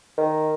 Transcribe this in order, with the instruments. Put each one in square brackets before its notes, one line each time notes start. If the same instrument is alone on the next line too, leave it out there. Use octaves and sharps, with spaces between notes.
[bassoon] D#3